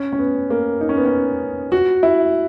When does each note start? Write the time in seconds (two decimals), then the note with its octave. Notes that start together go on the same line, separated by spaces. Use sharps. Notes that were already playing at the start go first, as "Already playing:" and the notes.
Already playing: C#4
0.13 C#4
0.19 B3
0.50 A#3
0.81 D#4
0.89 C#4
0.97 B3
1.05 C#4
1.72 F#4
2.03 E4